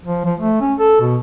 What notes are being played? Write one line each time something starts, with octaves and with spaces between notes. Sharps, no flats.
F3
F3
A3
C#4
A4
B2